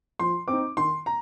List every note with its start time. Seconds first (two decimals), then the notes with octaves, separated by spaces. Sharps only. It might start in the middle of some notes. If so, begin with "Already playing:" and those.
0.19 F3 C6
0.48 C4 D6
0.53 D#4
0.77 D#3 C6
1.06 A#5